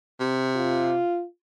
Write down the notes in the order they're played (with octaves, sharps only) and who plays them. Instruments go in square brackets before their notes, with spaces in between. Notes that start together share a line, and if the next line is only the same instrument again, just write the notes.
[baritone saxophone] C3
[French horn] F4